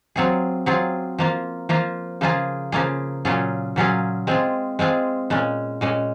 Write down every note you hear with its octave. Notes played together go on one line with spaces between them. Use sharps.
F#3 C4 F4 G#4
F#3 C4 F4 G#4
F3 A#3 F4
F3 A#3 F4
C#3 F3 A#3 F4 G#4
C#3 F3 A#3 F4 G#4
A#2 F#3 C#4 F4 G#4
A#2 F#3 C#4 F4 G#4
G#3 C4 F4 G#4
G#3 C4 F4 G#4
A#2 G#3 C#4
A#2 G#3 C#4